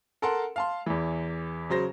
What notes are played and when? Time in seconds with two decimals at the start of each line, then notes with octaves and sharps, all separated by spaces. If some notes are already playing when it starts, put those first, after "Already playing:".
0.22 A4 A#4 F#5 A5 C6
0.56 F5 A5 C6
0.86 E2 E3
1.70 C#3 F#3 C5 A#6